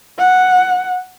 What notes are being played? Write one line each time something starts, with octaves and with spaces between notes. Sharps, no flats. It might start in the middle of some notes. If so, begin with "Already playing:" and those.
F#5